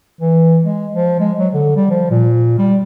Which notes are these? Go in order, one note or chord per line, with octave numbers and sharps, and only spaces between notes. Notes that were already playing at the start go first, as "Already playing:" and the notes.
E3
G#3
F3
G#3
F#3
D3
G3
F3
A#2
G3